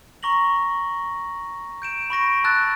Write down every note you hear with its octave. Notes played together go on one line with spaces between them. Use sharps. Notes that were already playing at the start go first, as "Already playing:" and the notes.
A#5 C#6 A#6 F#7
G6 D7 E7
B5 C#6 A#6 D7
A5 E6 F#6 A6